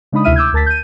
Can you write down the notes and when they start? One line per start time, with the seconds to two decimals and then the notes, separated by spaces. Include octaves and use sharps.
0.12 C#3 G#3 D4 D#4 B5 D#6
0.24 D2 C3 E4 E5 F6 D#7
0.36 D6 E6 G6 G#6
0.53 D2 A#4 A5 A6 B6
0.66 G6 D#7